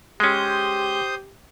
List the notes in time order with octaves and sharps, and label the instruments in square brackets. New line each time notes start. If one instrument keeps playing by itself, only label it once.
[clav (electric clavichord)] G#3 C#4 [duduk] G4 [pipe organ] C5 D#6 G6